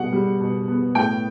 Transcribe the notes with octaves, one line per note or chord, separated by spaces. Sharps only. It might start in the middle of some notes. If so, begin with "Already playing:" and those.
Already playing: B2 G3 F#5
G3
B2
B3
A2 G5